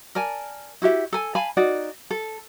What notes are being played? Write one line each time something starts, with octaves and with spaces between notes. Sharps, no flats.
A#4 D5 G#5 A5
E4 F#4 G4 E5
A4 G#5
F5 G#5 A5 B5
D#4 F#4 D5
A4